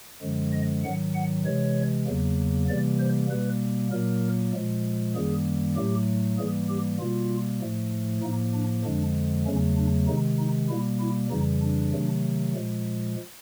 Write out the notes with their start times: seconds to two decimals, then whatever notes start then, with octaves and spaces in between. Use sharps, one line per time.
0.22 F#2 D3 F3 G#3
0.53 D#5
0.84 G#2 D#3 F#3 F#5
1.15 F#5
1.46 C3 E3 G#3 C#5
2.07 E2 C#3 F#3 A#3
2.69 C3 E3 G3 A#3 D5
3.00 C5
3.30 B2 G3 A#3 B4
3.92 A#2 F#3 A#3 A#4
4.53 A#2 F3 G#3
5.15 F#2 D#3 G3 A#3 G#4
5.77 A2 F#3 A3 G4
6.38 G#2 E3 G3 A#3 G#4
6.69 G4
7.00 B2 G3 A#3 F4
7.61 A2 F3 A3
8.23 A2 F3 A#3 D#4
8.54 D4
8.85 F2 D3 F3 G#3 D4
9.46 E2 C#3 F#3 A3 C#4
9.77 D4
10.08 C3 D#3 G#3 D#4
10.39 D#4
10.69 B2 G3 A#3 E4
11.00 E4
11.31 F2 C#3 E3 G3 D#4
11.62 D4
11.93 C3 D#3 F#3 A3
12.54 A#2 F3 G#3